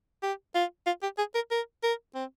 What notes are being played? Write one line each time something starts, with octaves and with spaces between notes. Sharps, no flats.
G4
F4
F4
G4
G#4
A#4
A#4
A#4
C4